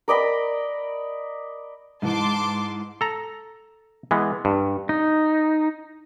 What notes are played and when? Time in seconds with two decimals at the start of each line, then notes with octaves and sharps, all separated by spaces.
0.08 A#4 D5 D#5 B5
2.02 G#2 E3 A5 C6 D6
3.01 A4 A#5
4.11 E3 G#3 B3
4.45 G2
4.89 D#4